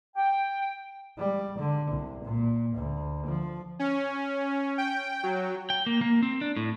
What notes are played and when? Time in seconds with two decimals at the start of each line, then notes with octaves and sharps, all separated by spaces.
0.16 G5
1.18 G3
1.58 D3
1.91 C2
2.24 A#2
2.76 D2
3.26 F3
3.79 C#4
4.78 G5
5.23 F#3
5.70 G5
5.86 A#3
6.01 A#3
6.23 C4
6.41 D4
6.56 A2